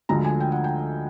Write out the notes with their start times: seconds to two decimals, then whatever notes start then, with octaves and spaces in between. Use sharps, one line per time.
0.09 D2 D3 F3 G#3 A#5
0.24 G#5
0.40 G5
0.52 F#5
0.64 G5